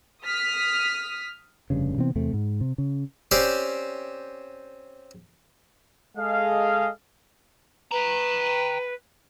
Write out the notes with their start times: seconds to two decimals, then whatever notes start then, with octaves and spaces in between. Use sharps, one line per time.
0.24 D#6 F6 B6
1.70 F1 G2 C#3
1.98 C3 E3 B3 C4
2.15 E2 C3 A3 C4
2.33 G#2
2.61 C3
2.78 C#3
3.31 C4 C#4 G4 C5 D5
6.17 G#3 G#4 A4 D#5 F5
7.92 B4 G5 A#5